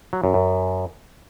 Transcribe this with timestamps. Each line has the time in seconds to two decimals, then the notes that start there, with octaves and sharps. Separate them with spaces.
0.13 F#3
0.24 F#2
0.34 F#2